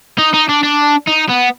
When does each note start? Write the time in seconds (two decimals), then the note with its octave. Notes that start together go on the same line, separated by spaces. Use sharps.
0.18 D#4
0.34 D#4
0.49 D4
0.63 D4
1.08 D#4
1.30 B3